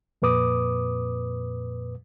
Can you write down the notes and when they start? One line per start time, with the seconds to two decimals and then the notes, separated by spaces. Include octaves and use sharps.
0.22 F2 A#2 B4 D6 D#6